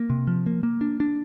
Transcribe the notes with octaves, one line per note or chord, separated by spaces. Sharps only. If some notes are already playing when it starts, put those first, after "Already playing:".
Already playing: A#3
C3
F3
A#3
A#3
D4
D4